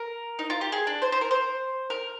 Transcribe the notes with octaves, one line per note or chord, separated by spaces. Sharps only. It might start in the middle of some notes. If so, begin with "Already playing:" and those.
Already playing: A#4
D#4
F4
G4
G#4
D4
C5
C5
A#4
C5
A#4